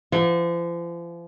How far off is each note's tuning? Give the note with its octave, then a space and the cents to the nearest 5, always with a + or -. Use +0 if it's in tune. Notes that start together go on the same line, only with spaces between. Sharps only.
F3 -40 F#5 -45